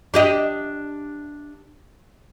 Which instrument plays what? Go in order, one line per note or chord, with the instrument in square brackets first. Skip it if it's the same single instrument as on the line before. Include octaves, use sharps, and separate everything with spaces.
[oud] D4 G4 D#5